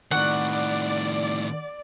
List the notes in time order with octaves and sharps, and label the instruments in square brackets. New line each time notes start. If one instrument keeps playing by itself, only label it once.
[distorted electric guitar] A2 D#3 [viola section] D5 [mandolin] F#5 C#6